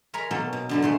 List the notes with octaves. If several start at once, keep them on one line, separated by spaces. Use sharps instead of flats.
G#3 A#4 C#5 A#5 B5
B2 F#3 A#3 C#4 A4
B2
F#2 D3 F#3
A2 G#3 A3